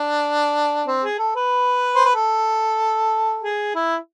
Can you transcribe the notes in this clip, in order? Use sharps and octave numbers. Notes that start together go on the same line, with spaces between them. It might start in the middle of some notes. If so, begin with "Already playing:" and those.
Already playing: D4
C4
G#4
A4
B4
C5
B4
A4
G#4
E4